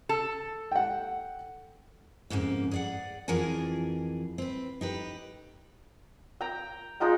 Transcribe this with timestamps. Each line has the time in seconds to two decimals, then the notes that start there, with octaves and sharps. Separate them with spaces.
0.09 A4
0.72 F#5 G5
2.30 F2 G#2 C#3 A#3
2.71 G#4 D5 F#5
3.28 F2 E3 F3 G#4 A#4 G#5
4.38 C4 B4
4.81 D#4 G4 B4
6.41 G5 A#5
7.00 G#3 D#4 F4 G5